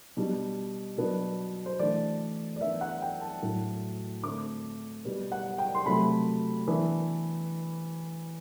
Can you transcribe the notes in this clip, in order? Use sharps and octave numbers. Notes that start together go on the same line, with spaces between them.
B2 G3 D4
B2 F#3 B3 D4
C5
E3 A3 D4 D5
D5
E3 B3 D4 E5
F#5
G5
A5
A2 F#3 A3 D4
D3 A3 C4 D6
B2 G3 B3
F#5
G5
C6
C3 F#3 A3 B5
E3 B3 D4